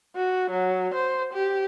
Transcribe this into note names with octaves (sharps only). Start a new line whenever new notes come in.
F#4
F#3
C5
G4